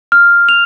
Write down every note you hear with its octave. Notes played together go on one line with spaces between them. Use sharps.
F6
F7